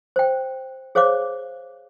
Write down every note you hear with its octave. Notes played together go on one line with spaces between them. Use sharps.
C5 G5
G#4 C5 C#5 F5 D6